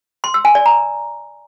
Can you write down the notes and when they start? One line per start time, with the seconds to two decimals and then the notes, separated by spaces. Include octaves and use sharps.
0.24 C6
0.34 E6
0.45 G#5
0.55 D5
0.66 A#5